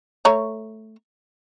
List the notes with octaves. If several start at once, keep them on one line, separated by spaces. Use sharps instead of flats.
A3 C#5 A#5